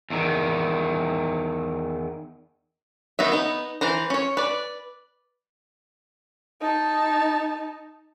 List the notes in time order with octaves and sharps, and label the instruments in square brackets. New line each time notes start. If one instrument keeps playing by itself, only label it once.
[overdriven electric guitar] E2 D#3
[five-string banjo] D#3 B3 D#4 E5
B3 D#4
E3 B4 C5 A#5
C#4 C#5
B4 D5
[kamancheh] D#4 A5